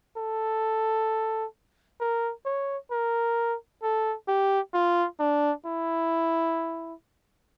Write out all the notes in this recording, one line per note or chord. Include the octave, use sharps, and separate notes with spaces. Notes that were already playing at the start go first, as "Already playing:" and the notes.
A4
A#4
C#5
A#4
A4
G4
F4
D4
E4